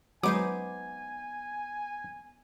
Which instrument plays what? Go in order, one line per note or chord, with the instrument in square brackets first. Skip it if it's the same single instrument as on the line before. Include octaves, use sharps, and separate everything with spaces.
[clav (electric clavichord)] F#3 G#3 [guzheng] B3 D#4 C5 [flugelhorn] G#5 [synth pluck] D6